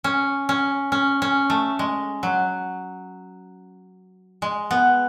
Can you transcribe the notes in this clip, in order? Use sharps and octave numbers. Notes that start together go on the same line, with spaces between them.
C#4
C#4
C#4
C#4
A3
G#3
F#3
G#3
B3